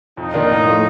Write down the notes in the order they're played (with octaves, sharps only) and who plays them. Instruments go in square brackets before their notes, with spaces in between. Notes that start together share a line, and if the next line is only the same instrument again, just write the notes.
[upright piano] F2 [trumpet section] D#4
[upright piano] D#3 A#3 D4 F4
A2
F3 A3